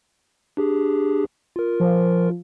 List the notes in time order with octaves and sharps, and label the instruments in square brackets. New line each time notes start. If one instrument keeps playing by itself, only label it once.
[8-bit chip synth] D4 G4 G#4
F4 A#4
[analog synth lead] F3